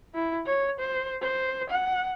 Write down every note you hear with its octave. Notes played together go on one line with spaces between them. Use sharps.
E4
C#5
C5
C5
F#5